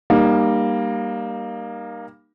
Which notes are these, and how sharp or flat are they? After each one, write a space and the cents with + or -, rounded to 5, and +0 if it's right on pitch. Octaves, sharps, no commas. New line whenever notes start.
G3 +10 A#3 +10 D#4 -25